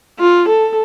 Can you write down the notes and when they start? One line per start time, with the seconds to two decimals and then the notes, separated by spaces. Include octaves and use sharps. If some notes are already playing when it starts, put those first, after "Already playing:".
0.19 F4
0.49 A4